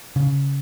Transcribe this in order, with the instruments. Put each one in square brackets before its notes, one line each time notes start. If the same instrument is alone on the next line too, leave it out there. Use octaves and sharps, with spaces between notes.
[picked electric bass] C#3